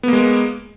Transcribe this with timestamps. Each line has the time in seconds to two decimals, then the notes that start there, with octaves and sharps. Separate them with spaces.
0.03 B3
0.08 A#3
0.13 G#3